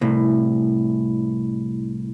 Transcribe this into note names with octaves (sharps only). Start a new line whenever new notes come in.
C2 A2